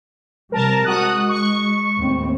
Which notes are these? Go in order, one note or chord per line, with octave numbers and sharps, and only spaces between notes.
C3 G3 A#4 A5
G#3 F#4 D#6 F#6
C#6
D#2 A2 C4